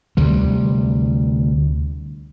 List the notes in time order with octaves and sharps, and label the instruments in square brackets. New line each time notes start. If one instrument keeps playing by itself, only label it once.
[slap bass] D2 C3 G3